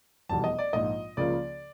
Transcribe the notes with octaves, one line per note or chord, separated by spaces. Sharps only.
F1 E2 B2 G3 A5
D#5
D5
A#1 G#2 F3 D#5
C#2 C#3 F3 A#3 C#4 D5